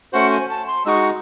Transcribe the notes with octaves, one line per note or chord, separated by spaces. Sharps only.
A3 C#4 F#4 C5 F#5
G#5
A5
C6
G#3 D#4 F#4 C#6 E6